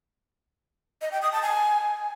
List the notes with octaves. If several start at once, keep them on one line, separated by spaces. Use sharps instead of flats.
D#5
G5
D#6
A5
G#5